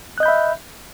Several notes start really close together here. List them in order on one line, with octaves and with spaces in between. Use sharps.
F#6 D#5 G6 B5 E5